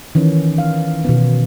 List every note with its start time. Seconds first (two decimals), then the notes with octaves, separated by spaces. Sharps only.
0.15 D#3 E3 C#4
0.58 F5
1.05 B2 D#3 B3